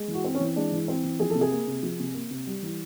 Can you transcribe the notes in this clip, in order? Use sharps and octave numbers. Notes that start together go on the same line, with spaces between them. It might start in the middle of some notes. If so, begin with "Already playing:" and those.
Already playing: G#3
E3
F#4
C4
C#4
E3
G#3 D4
E3
C4
E3
F3 G#4
A4
C3
G#4
A#3
C3
F3
C3
A#3
C3
G3
E3